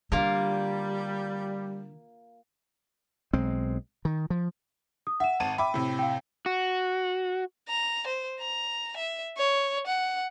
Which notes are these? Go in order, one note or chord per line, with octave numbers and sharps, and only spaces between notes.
D3 G3 A#3 F4 A#4
B1 G#3 C4
D#3
F3
D#6
E5 F#5 E7
G#1 A5 D#7
E5 G5 B5 D6
A2 C3
F5 G5
F#4
A#5
C5
A#5
E5
C#5
F#5